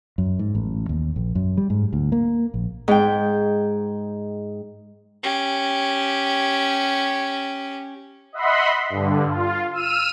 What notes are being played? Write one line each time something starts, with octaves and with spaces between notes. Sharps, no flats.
F#2
G#2
A1
D#2
A#1
F#2
G3
G#2
D2
A#3
A#1
G#2 G5
C#4 G4
D#5 E5 F#5 B5 C6
G2 D3
F4
E6 F6 D#7